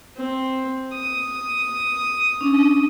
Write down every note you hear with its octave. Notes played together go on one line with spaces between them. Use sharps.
C4
D#6
C#4 D4